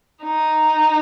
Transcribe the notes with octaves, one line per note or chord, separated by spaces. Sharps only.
D#4